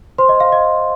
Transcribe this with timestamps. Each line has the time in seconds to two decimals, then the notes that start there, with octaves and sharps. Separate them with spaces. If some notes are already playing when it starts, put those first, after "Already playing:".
0.18 C5 C6
0.29 D#5
0.40 F5
0.52 D#5